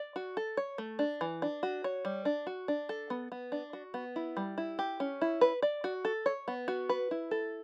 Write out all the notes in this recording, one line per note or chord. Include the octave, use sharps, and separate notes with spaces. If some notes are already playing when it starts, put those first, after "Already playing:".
Already playing: D5
F#4
A4
C#5
A3
D4
E3
D4
F#4
C#5
G3
D4
F#4
D4
A4
B3
B3
D4
F#4
B3
E4
G3
E4
G4
C#4
E4
B4
D5
F#4
A4
C#5
B3
F#4
B4
E4
A4